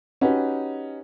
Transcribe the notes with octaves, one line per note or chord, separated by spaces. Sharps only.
C#4 D#4 F#4 G4 B4